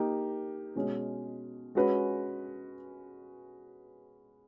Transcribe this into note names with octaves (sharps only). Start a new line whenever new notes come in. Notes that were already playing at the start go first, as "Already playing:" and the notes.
Already playing: A#3 D#4 G4
B2 G#3 C#4
G#3 C#4 F#4 B4